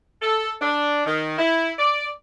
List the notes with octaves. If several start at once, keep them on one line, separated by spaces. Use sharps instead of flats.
A4
D4
D#3
E4
D5